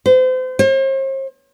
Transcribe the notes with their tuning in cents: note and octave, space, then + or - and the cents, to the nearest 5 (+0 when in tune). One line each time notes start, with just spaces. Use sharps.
C5 -35
C5 +45